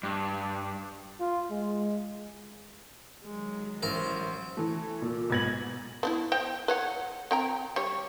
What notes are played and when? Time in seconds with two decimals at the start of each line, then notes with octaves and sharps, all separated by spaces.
0.03 G2
1.20 F4
1.51 G#3
3.24 D#3 F#3 G#3
3.83 A1 A#4 C5
4.57 E3 A3
5.02 A#2
5.30 B1 G#2 B4 G#6 A#6 F#7
6.03 B3 D#4 E4
6.32 C5 D#5 G5
6.68 B4 C#5 F#5
7.31 C4 G5 A#5
7.76 G3 C#5